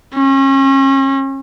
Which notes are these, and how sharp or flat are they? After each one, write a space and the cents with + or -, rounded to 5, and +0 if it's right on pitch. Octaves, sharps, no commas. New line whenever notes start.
C#4 -35